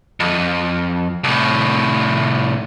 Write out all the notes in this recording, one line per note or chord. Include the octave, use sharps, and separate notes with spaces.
F2
C2 A2